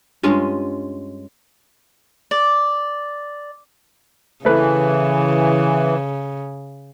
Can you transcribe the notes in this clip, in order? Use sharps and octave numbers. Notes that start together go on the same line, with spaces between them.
G2 G#3 C#4 F4
D5
C#3 E3 A3 B4